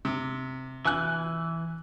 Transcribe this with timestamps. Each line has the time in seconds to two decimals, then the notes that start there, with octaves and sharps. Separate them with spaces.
0.05 C3
0.85 E3 G#5 F#6